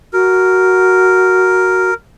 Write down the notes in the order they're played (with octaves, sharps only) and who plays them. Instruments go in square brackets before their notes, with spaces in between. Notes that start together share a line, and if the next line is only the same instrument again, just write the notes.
[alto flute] F#4 [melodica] A#4